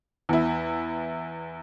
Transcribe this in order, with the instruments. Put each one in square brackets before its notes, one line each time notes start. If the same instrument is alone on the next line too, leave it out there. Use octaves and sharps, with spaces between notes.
[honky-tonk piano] E2 E4